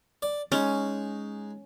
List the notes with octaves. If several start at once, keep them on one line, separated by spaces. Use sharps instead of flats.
D5
G#3 C#4 D#4